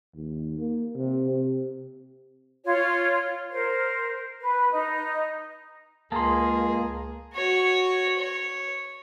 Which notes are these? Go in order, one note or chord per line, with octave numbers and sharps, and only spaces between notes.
D#2
A#3
C3
C3
F4 C#5
A#4 C5
B4
D#4
C#2 A#3 G#4 A5 A#5 C6
F#4 C#5
C#5